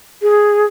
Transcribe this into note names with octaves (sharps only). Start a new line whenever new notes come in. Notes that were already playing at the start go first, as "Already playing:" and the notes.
G#4